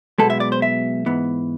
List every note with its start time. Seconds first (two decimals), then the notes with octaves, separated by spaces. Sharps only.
0.18 B1 B2 G#3 B3 A4
0.30 E5
0.40 D5
0.52 C5
0.62 E5
1.06 G#2 E3 B3